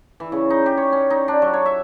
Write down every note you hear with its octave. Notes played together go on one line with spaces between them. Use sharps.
E3
C#3
D#4
G4
C#5
C#4
D#4
D4
F#3
C#5
E5